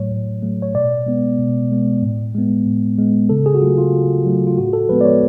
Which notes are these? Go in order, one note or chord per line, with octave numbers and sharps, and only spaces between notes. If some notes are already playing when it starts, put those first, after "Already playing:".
Already playing: A2 F#3 A3 C#5
A2
F#3 A3
C#5
B2 D5
G#3 B3
B2
G#3 B3
A2
G#3 B3
A2
G#3 B3
C#3 A4
G#4
F#4
F#3 A3 F4
F4
C#3
F#3 A3
F4
A2 F#4
A4
F3 G#3 B3 B4
D5
C#5